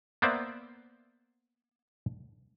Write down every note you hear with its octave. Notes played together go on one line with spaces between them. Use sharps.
A#3 B3 C5 D5 E5